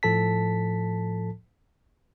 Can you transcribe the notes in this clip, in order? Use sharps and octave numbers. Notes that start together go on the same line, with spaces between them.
A2 F3 A4 A5 B6